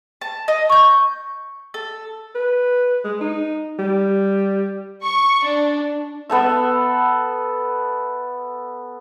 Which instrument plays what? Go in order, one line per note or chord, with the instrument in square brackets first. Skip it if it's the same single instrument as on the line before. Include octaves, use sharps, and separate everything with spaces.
[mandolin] A5
D#5
C#6 G6
A4
[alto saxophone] B4
G#3
D#4
G3
[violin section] C#6
D4
[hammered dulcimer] B3 A4 E5